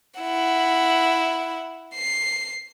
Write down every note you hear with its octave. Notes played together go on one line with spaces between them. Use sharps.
E4 F#5
C7